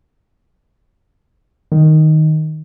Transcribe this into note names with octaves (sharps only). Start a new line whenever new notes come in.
D#3